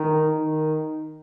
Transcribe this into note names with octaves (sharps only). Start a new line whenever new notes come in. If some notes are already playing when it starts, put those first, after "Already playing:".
Already playing: D#3
D#3